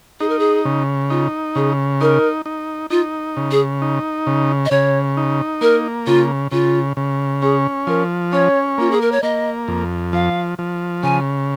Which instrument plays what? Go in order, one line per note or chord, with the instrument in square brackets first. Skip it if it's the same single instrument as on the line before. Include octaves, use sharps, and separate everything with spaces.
[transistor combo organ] D#4 [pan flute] G#4
[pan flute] A#4
G#4
[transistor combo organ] C#3
[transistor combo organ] D#4 [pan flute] F4
[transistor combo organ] C#3 [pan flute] G#4
[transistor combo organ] D#4 [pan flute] A#4
[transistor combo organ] D#4
[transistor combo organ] D#4 [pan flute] F4
[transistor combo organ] C#3
[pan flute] G#4
[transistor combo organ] D#4
C#3
[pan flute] D#5
[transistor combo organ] C#3 [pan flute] C#5
[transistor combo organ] D#4
[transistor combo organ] A#3 [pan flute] A#4
[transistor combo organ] C#3 [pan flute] F4
[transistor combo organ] C#3 [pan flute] F4
[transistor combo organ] C#3
[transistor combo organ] C#4 [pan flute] G#4
[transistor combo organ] F3 [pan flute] A#4
[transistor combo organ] C#4 [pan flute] C#5
[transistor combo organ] A#3 [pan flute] F4
[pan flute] G#4
A#4
C#5
[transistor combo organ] A#3 [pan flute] D#5
[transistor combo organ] F2
[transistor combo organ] F3 [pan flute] F5
[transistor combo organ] F3
[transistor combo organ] C#3 [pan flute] G#5